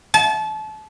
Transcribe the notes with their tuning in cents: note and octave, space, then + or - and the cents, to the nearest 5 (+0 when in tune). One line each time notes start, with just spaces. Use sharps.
A5 -30